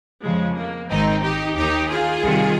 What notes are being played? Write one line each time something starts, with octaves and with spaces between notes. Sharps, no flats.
F2 C#3 F3 G#3
A#3
G#1 G#2 D#3 C4 D#4
D#4 G4
D#2 D#3 D#4 G4
F4 G#4
C2 C3 D#3